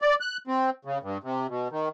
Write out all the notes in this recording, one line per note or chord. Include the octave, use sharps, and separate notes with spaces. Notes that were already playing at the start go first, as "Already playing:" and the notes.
D5
F#6
C4
C#3
G2
C3
B2
D#3